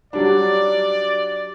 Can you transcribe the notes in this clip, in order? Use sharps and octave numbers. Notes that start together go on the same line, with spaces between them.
F#3 G3 D4 D5